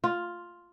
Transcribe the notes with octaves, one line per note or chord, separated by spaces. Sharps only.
F4